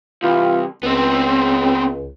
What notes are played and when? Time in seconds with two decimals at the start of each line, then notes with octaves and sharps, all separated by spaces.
0.23 C2 E3 F4
0.83 C#2 B3 C4